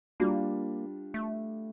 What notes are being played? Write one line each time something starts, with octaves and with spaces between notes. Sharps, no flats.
G3 A#3 D4 F4
A3